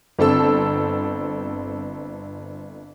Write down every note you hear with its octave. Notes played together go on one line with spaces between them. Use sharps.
G1 C4 A4 E6